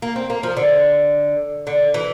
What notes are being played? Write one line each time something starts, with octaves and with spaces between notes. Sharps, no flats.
A#3
C4
A#3
F3
D3
D3
E3